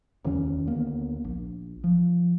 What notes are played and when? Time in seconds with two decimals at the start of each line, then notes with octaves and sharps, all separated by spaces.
0.24 D1 E2 D#3 C#4
0.67 D2 A#3 B3
1.24 A#1
1.84 F3